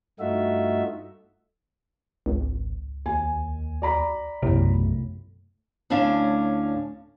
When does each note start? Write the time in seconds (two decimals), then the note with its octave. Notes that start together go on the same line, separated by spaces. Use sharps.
0.19 G2 A3 D#4 F4 F#4 E5
2.26 G#1 C#2
3.06 D#2 G#5
3.82 D5 A#5 B5
4.42 B1 F#2 A2 C3
5.90 D2 A2 C#4 D4 F5